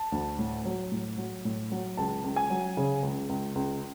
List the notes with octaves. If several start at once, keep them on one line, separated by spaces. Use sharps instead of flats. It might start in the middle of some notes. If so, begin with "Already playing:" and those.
Already playing: A5
D2
A2
F#3
A2
F#3
A2
F#3
C#2 A5
C#2
G#5
F#3
C#3
C#2
C#2
C#2